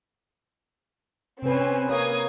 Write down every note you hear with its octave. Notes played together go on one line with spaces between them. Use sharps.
C3 C4 C#4 B4 G#5
A#3 C#5 D#6 G#6